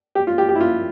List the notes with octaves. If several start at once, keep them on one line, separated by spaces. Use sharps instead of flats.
G4
F4
G4
G4
E4
F4